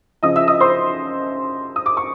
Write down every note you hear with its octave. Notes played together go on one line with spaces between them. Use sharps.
C#3 F3 D#5 D#6
E5 E6
D#5 D#6
C5 C6
D#6
D6
C#6